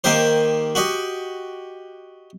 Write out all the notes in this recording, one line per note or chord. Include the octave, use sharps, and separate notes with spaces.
D#3 A#3 G4 C5
F#4 G4 D#5